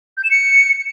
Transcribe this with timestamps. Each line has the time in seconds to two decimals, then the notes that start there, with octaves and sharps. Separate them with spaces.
0.17 G6
0.24 E7
0.31 C#7